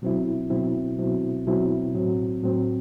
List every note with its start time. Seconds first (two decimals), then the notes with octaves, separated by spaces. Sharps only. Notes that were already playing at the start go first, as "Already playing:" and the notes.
0.02 B2 F#3 C4 E4
0.50 B2 F#3 C4 E4
0.99 B2 F#3 C4 E4
1.47 B2 F#3 C4 E4
1.95 A2 F#3 C4
2.43 A2 F#3 C4